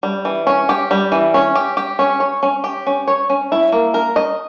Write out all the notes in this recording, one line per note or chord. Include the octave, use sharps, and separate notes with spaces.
G3
E3
C#4
G4
G3
E3
C#4
G4
G4
C#4
C#5
C#4
G4
C#4
C#5
C#4
E4
A#3
A#4
D#5